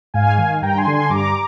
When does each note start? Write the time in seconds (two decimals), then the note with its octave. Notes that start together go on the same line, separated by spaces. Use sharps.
0.14 G#2 F5 G#5
0.38 D#3
0.62 G2 G5 A#5
0.78 G#5 C6
0.87 D3
0.94 G#5 C6
1.10 G2 A#5 D6